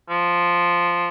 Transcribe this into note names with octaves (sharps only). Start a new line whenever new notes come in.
F3